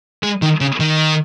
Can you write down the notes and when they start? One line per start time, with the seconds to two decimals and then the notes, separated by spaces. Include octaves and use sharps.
0.23 G#3
0.42 D#3
0.60 C#3
0.80 D#3